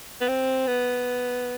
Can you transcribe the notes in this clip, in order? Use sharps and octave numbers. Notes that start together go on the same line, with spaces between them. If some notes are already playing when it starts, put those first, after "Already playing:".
B3
C4
B3